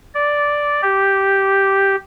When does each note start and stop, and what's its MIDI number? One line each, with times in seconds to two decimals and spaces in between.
0.14 0.81 74
0.82 1.96 67